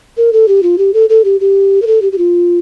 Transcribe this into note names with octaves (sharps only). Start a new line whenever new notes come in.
A#4
A4
G4
F4
G4
A4
A4
G4
G4
A#4
A4
G4
G4
F4